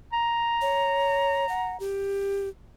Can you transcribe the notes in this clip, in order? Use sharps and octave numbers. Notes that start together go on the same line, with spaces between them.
A#5
C#5
F#5
G4